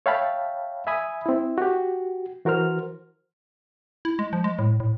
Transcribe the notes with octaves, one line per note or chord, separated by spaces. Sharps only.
C#5 E5 F5 G5 A5 B5
E5 G#5 B5 D#6
C4 E4
F#4 G4
E3 F#4 A#4 C5 F6
E4
G#3
F3
G#3
A2
A2